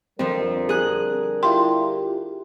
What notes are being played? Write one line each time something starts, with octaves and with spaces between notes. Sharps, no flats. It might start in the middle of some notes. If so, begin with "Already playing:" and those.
F2 D3 F3 G3 C4 A#4
G#4 F#6
E4 F4 G4 C6